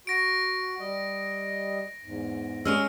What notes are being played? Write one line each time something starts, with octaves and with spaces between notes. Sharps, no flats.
F#4 A#6 D7
G3 D#5
E2 G#2
G#3 C#4 G#4 E6 F6